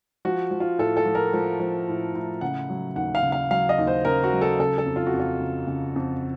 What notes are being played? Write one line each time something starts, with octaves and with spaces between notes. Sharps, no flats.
F3 F#4
F3
F4
A2 A4
A4
F3
A#4
F3
F3
A2
A2
C#3 F#5
F#3
D#2 F#5
F5
C#3
F5
F#3 F5
D#5
D#2
C5
C#3 A#4
F#4
F#3
A4
C#3 A4
A4
F2
F4
F#4
F2
F4
C#3
C#3
F2